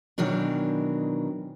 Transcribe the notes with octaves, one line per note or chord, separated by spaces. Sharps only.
B2 D#3 E3 F#3 D4